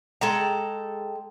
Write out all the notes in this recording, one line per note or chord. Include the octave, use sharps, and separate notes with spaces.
G#3 A4 G5 A#5